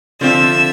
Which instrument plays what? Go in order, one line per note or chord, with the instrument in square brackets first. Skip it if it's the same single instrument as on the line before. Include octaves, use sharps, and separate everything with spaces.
[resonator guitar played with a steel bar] D3 F3 C4 F4 [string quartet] E5